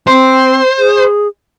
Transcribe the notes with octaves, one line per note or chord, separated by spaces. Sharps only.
C4 C5
G#4